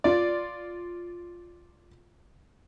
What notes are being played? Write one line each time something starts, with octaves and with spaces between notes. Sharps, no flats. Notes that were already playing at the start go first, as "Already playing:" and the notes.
F4 D5